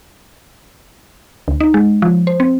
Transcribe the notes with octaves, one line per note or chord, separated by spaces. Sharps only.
D2
D#4
G#3
F3
C5
C4